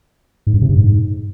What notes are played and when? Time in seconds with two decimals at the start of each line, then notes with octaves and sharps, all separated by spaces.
0.47 G#2
0.54 G2
0.62 C3
0.69 G2
0.77 G#2